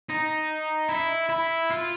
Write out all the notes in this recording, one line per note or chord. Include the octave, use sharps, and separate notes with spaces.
D#4
E4
E4
F4